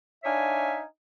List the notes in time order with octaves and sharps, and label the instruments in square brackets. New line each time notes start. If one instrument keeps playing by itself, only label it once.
[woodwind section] D4 D#4 C#5 E5 F5 G#5